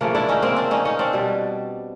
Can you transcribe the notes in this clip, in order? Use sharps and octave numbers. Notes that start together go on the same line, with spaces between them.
C#3 F3 A3 A#3
D4 E4
C#4 D#4
A#3 C4
C4 D4
C#4 D#4
C#4 D#4
C4 D4
B2 G3